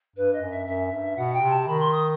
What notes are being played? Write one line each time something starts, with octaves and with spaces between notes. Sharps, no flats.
G2 B4
D#5
F#2
E5
F#2 E5
G2
B2 F#5
G5
C3
A5
D#3 B5
C6
D#6